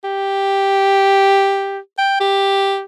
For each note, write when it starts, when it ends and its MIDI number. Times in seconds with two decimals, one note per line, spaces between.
0.04 1.79 67
1.98 2.16 79
2.20 2.83 67